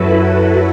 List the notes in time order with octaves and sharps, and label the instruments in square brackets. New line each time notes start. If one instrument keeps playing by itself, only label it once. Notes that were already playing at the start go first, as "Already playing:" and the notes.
Already playing: [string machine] F#2 F#3 E4 F#4 A4 B4